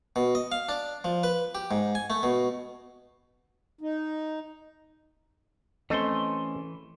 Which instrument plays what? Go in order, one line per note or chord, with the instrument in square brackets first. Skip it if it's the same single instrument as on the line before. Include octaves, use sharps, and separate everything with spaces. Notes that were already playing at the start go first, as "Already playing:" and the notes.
[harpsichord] B2
D#5
F5
D4
F3
B4
G4
G#2
G#5
A3
B2
[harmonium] D#4
[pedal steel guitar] E3 C6 [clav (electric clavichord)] A3 A4 C5 [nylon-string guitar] C4 C#4 D#5